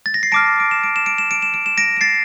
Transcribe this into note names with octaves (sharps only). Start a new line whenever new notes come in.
A6
A#6
C7
A5 D6 F6 A#6 D7
D7
E7
D7
E7
D7
E7
D7
E7
D7
E7
A#6 D7
D7
A6 C7